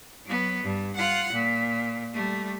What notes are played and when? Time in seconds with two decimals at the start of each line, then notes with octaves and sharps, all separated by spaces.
0.25 F#3 B3
0.62 G2
0.95 F4 F#5
1.33 A#2
2.13 G3 A3